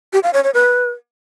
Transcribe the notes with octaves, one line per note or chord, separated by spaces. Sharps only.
G4
F5
C#5
C#5
B4